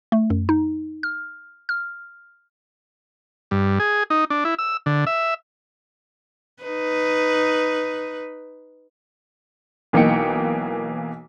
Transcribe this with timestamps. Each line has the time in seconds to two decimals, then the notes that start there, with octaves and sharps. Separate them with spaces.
0.12 A3
0.30 F#2
0.49 D#4
1.03 F6
1.69 F6
3.51 G2
3.80 G#4
4.10 D#4
4.30 D4
4.45 E4
4.59 E6
4.86 D3
5.07 E5
6.63 D#4 B4
9.93 B1 E3 A#3 D#4 G5 C#7